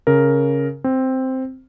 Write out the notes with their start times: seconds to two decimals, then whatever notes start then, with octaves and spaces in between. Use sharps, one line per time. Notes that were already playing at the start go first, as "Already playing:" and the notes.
0.07 C#3 A#4
0.84 C4